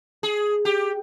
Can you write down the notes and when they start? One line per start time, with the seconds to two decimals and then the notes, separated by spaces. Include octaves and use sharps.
0.23 G#4
0.65 G4